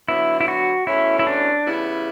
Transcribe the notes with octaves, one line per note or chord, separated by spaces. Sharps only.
D3 F#3 B3 E4
E4
F#4
E2 B2 A3 C#4 E4
E4
D4
C#3 E3 G3 B3 E4